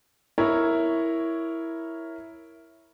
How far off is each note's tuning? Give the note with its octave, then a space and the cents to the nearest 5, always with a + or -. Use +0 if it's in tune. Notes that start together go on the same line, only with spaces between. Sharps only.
E4 +0 A#4 +0 C#5 +0